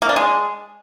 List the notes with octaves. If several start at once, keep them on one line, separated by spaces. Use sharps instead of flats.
A#3
D4
G#3